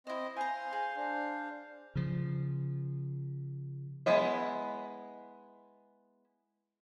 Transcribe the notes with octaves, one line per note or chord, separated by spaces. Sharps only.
C4 E4 C5 D#5
C5 F5 G#5 A#5 C6
G#4
D4 C5 F5
C#3 F3
G#3 B3 E4 D#5 E5